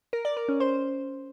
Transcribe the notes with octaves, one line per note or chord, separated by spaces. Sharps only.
A#4
D5
A#4
C#4
C5